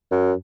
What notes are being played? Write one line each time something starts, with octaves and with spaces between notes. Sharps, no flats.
F#2